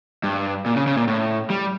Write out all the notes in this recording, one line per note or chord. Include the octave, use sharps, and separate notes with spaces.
G2
A#2
C#3
C#3
A#2
A2
G3